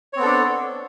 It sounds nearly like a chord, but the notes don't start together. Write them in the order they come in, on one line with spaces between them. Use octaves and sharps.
C#5 C4 B3 A4 D4